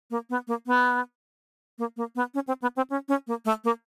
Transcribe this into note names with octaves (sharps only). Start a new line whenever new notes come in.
A#3
B3
A#3
B3
A#3
A#3
B3
C#4
C4
B3
C4
C#4
C#4
A#3
A3
A#3